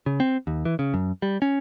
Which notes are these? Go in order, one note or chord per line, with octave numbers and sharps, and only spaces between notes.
C#3
C4
D#2
E3
C#3
F#2
G3
C#4